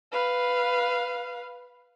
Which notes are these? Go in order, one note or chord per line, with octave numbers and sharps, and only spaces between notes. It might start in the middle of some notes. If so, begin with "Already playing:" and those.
B4 F5